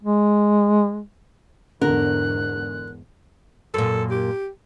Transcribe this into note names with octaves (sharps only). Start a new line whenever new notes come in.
G#3
E2 G#2 D3 A#4 F#6
F#2 A#2 A4
G4